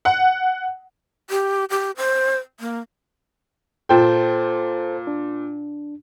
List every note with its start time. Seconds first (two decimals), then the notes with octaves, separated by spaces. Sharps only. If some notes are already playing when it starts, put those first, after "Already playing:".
0.05 F#5
1.30 G4
1.70 G4
1.97 C5
2.60 A#3
3.89 A#2 A4 C5 G5 A5
5.07 D4